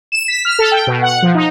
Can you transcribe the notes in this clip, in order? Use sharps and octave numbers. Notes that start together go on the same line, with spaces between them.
E7
B6
F6
A4
G5
B2
F#5
F3
D#4